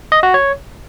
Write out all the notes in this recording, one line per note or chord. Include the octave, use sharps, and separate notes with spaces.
D#5
F#4
C#5